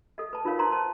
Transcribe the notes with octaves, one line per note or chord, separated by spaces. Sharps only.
A4 D#5
B4 A5
D#4 F4 A#4 B4 C#5 F5
D#4 C5 A5 A#5 C6
C5 A5